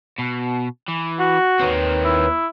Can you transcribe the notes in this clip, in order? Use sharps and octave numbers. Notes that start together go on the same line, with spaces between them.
B2
E3
F#4
D#2 D#3 C4 B4 C#5
E4